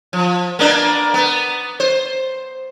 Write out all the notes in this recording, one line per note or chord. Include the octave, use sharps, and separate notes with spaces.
F3
A#3 B3 D4
B3
C5